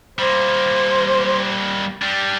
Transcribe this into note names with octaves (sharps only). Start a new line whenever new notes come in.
G3 A#3 C5
G3 D4